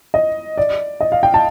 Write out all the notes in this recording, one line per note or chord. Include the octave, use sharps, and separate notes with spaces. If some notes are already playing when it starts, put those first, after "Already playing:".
D#5
D5
D#5
F5
G5
A5